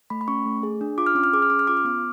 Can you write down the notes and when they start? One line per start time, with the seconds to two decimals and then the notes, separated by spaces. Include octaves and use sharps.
0.10 A3 B5
0.21 B5
0.28 C#4 C#6
0.46 A3
0.63 G#4
0.81 D4
0.98 F4 D6
1.06 F6
1.15 C#4 D6
1.24 F6
1.33 G#4 D6
1.42 F6
1.50 C#4 D6
1.59 F6
1.67 F4 D6
1.77 F6
1.85 B3 D6